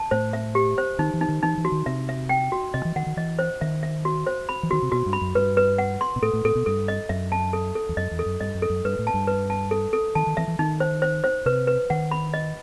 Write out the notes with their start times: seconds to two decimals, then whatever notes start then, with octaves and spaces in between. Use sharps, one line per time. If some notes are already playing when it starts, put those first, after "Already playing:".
Already playing: A5
0.11 A2 C5
0.33 E5
0.55 G4
0.78 C5
0.99 D#3 D#4
1.14 E3
1.21 D#4
1.29 D#3
1.43 E3 D#4
1.58 E3
1.65 F#4
1.72 D#3
1.86 C3 E5
2.09 E5
2.29 G5
2.52 F#4
2.74 C3 D#5
2.85 E3
2.96 D#3 F#5
3.06 D#3
3.17 E3 D#5
3.39 C5
3.61 D#3 E5
3.83 E5
4.05 F#4
4.27 C5
4.49 B5
4.63 E3
4.71 D#3 F#4
4.82 C3
4.92 B2 F#4
5.06 G2
5.13 B5
5.21 F#2
5.35 G2 B4
5.57 B4
5.78 F#5
6.01 C6
6.16 B2
6.22 A2 A4
6.33 A2
6.45 A2 A4
6.55 B2
6.66 G2 A4
6.88 D#5
7.09 F#2 E5
7.32 A5
7.53 A4
7.75 A4
7.89 E2
7.97 F#2 D#5
8.11 E2
8.19 A4
8.26 F#2
8.40 G2 D#5
8.55 F#2
8.62 A4
8.70 F#2
8.85 G2 B4
8.99 A2
9.07 A5
9.14 G2
9.27 B4
9.50 A5
9.71 A4
9.93 A4
10.15 D#3 A5
10.27 D#3
10.37 E3 E5
10.48 E3
10.59 D#3 D#4
10.80 C5
11.02 C5
11.24 C5
11.46 C3 B4
11.67 B4
11.90 D#3 F#5
12.11 B5
12.34 D#5